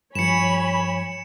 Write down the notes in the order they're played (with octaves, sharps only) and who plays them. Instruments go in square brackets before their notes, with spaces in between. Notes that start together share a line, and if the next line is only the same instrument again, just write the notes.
[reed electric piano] G2 F3 [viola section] C#5 G#5 B5 [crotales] C#7 E7